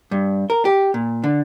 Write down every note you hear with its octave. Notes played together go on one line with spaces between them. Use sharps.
G2
A#4
G4
A#2
D3